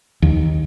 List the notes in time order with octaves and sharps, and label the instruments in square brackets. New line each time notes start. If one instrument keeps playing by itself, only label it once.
[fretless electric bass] D#2